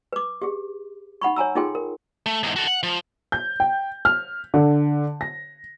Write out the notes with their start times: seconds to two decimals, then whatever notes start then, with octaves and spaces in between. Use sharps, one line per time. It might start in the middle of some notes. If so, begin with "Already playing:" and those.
0.13 B4 D6
0.42 G4 G#4
1.21 D#4 F#5 B5 C#6
1.36 C#5 G#5 A#5 E6
1.55 D#4 F4 G#4 A4 G5 C6
1.75 A#4
2.26 A3
2.43 E2 G#2
2.56 F#4 A4
2.67 F#5
2.83 F3
3.32 G6
3.60 G5
4.05 F6
4.54 D3
5.21 A#6